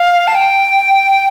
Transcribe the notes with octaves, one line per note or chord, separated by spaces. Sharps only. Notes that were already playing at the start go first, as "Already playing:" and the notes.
Already playing: F5
A5
G5